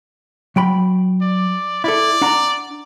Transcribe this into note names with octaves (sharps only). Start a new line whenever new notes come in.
F#3 G5 B5
D5
E4 A4 D5
D4 F#5 A#5